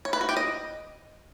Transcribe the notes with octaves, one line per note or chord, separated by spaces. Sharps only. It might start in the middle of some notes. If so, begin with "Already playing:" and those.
C#5
B4
F#4
G4
D#5